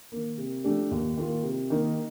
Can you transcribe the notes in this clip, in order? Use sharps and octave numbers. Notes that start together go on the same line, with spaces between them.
D#3 A#3
C3
F3 A3 D4 G4
D#2
D#3 A#3 F4
C3
D#3 A#3 D#4